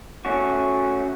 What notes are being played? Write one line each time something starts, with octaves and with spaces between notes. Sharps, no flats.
A3 C#4 F#4